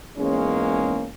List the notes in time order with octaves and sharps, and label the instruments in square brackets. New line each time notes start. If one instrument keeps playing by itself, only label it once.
[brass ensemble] E2 G#2 G#3 A#3 C#4